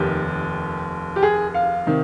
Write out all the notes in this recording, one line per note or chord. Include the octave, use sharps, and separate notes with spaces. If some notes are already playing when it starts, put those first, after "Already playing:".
Already playing: F1 D#2 D#3 G4
G4
G#4
F5
C3 D#3